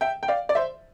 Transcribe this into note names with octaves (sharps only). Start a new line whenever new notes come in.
E5 G5
G5
D5 F5
D5
C5 E5